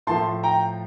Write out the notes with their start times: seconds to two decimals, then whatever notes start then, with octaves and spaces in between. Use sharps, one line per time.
0.07 A2 F3 A3 A5 C6
0.43 G5 A#5